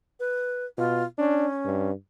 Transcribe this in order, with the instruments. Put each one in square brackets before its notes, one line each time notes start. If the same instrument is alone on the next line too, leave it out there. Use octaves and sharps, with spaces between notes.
[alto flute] B4
[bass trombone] B2 [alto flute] F4
[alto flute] C#4 [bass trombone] D4
[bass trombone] G2